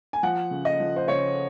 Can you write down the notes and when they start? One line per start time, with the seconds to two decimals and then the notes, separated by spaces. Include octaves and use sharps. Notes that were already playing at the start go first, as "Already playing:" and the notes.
0.13 G#5
0.23 F3 F#5
0.51 C#3
0.65 D#5
0.80 F3
0.96 C5
1.08 C#3 C#5